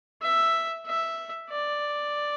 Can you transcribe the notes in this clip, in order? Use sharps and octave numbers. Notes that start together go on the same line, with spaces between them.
E5
E5
D5